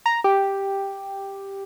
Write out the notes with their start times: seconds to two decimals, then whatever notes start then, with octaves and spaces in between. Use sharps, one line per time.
0.06 A#5
0.24 G4